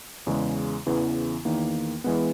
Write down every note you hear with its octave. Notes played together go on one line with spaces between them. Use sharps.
E2 C#3 G#3
E2 C#3 E3 B3
E2 D#3 A#3
E3 G#3 B3